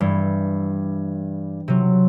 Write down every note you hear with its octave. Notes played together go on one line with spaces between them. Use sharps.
G2 E3
C3 F#3